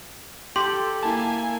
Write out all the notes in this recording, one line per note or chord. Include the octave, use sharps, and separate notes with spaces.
G4 A4 C6
A#3 E4 G#5 A5